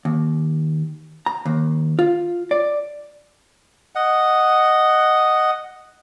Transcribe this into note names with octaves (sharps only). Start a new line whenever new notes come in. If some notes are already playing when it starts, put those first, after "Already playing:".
D#2
A#5
D#2
F4
D5
D#5 F#5